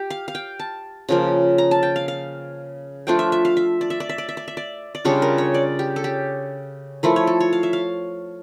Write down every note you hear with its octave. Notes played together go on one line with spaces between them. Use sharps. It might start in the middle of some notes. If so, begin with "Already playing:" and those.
Already playing: G4
F5
F5
G5
A5
C#3 F3 A#3
A#5
A5
G5
F5
F5
F3 A3 D4 F4 G5
E5
E5
F5
E5
D5
E5
D5
E5
D5
E5
D5
E5
D5
D5
C#3 G3 D4 F4 C#5
A#4
C#5
D5
G4
A4
G4
F3 A3 E4 A#4
C#5
A4
C#5
F5
E5
F5